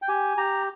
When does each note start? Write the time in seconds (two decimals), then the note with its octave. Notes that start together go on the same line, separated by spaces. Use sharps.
0.02 G5
0.08 G4 G#5
0.37 G4 A#5